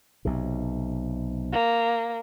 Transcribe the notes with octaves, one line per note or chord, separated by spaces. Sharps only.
B1 C3
A#3